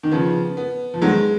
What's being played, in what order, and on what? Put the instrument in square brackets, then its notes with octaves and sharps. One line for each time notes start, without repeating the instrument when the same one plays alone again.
[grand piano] D#3
[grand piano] C#3 F3 [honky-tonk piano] B3
[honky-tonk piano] B3
[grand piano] F3
[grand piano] D#3 F#3 [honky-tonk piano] G#3